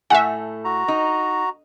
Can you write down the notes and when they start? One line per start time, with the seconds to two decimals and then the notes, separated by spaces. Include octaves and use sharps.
0.10 A2 A3 A4 E5 F#5 G#5
0.65 F#4 A#5
0.88 D#4